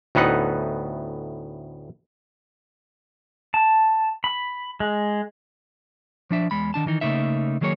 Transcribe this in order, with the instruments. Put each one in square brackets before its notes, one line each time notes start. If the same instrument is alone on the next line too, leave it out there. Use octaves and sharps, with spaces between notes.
[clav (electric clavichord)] D2 A2 B3 D#4 F#5
[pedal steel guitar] A5
B5
G#3
[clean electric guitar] F3 D4 E5
E2 G#3 B5
D#3 D4 A5
D#3 E3 D#4
C#3 A3 A#3 D#4 E5
D#3 F#3 A#3 G#4 C#5